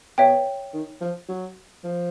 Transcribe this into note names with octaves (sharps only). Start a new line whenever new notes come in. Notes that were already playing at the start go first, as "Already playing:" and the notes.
B2 C#5 E5 G5
D#3
F3
F#3
F3